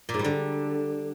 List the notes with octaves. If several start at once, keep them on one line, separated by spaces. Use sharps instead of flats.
A#2
G#2
G3
D3